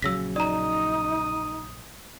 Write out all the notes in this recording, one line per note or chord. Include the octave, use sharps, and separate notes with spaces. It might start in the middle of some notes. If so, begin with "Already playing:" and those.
A#1 C#3 F#3 E6 A#6 B6
D#4 D5 A#5 D#6